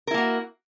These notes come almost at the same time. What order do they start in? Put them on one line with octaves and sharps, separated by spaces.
A#4 E4 A#3 F#4